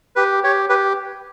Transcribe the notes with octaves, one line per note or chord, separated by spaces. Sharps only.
G4 B4
G4 C#5
G4 B4